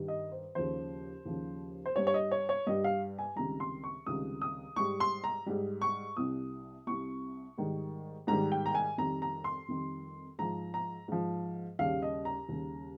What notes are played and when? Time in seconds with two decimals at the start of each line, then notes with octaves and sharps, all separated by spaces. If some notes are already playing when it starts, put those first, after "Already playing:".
Already playing: G2 D#3 G3
0.08 D#5
0.32 C5
0.55 D#2 C#3 F3 C5
1.25 D#2 C#3 F3
1.86 C5
1.96 G2 G3 C#5
2.07 C#5
2.14 D#5
2.31 C#5
2.49 C#5
2.67 G2 G3 D#5
2.84 F5
3.19 G#5
3.36 C#2 C3 D#3 G3 A#5
3.60 C6
3.84 C#6
4.06 C#2 C3 D#3 G3 D#6
4.42 D#6
4.76 G#2 G3 C#6
5.00 C6
5.24 A#5
5.46 G#2 G3
5.82 C#6
6.17 C2 C3 G3 D#6
6.87 C2 C3 G3 C#6
7.58 G#2 D#3 G3
8.27 G#2 D#3 G3 A#5
8.52 G5
8.66 A#5
8.75 G#5
8.98 F2 D#3 G3 A#5
9.22 A#5
9.44 C6
9.68 F2 D#3 G3
10.39 G#2 F3 A#5
10.74 A#5
11.08 G#2 F3
11.79 D#2 C#3 G3 F5
12.02 D#5
12.25 A#5
12.49 D#2 C#3 G3